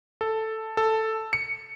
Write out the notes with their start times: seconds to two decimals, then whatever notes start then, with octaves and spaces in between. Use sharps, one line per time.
0.21 A4
0.77 A4
1.33 C#7